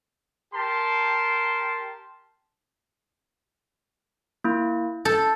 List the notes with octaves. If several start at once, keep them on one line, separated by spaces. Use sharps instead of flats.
G4 A#4 A5 C6
A#3 E4
A4 G6